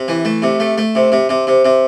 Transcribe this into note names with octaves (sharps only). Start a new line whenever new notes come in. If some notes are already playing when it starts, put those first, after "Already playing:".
Already playing: C3
E3
A3
C3
A3
A3
C3
C3
C3
C3
C3